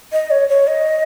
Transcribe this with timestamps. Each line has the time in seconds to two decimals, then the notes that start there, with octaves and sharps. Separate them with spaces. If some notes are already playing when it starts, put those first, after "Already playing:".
0.13 D#5
0.31 C#5
0.49 C#5
0.67 D#5